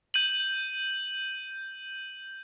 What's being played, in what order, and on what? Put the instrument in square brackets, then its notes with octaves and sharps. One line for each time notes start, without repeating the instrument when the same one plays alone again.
[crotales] G6 D#7 F#7